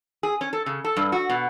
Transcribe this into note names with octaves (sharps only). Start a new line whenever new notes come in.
G#4
C#4
A4
C#3
A4
G2
F#4
B2